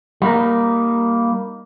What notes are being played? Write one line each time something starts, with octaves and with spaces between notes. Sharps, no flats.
G3 A#3 D#4